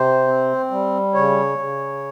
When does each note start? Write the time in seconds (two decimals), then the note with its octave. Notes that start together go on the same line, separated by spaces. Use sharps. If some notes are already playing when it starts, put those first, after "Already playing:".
Already playing: C3 C5
0.27 C4
0.71 G3
1.14 C#3 C#5
1.58 C#3